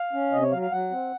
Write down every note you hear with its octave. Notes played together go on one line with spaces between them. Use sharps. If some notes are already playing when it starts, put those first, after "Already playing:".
Already playing: F5
C#4
C3 D#5
C#5
F#3 F5
F5
F#3 F#5
C4